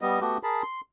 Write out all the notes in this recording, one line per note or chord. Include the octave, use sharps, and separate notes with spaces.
G3 B3 D#5
A3 B3 F#4 G4
G#4 A#4 A5 B5
C6